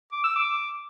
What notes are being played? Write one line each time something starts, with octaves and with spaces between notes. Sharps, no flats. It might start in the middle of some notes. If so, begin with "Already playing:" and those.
D6
E6
D6